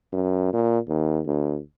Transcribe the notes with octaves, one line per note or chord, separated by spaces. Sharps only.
F#2
A#2
D#2
D2